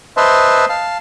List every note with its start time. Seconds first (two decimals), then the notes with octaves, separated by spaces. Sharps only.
0.17 B4 C5 D#5 E5 A5 C6
0.69 F5 A5